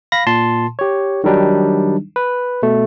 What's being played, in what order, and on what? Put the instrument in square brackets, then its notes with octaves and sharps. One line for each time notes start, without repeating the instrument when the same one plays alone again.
[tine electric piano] F5 B5 A#6
A#2 A5 C6
G4 C#5
D#3 F#3 G3 D4 D#4
B4
B2 A3